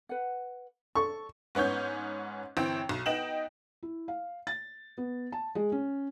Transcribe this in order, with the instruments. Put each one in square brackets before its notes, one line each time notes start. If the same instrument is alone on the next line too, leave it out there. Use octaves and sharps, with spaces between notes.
[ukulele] B4 F#5
[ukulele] A4 [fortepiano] C#6
[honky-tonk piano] G#2 B3 C#4 C#5 G6
G1 E3 C4 G5
B1
B3 D#4 G5 E7 F#7
[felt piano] E4
F5
A6
B3
A5
G#3
C#4